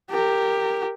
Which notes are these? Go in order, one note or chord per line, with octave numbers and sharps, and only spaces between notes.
G4 A#4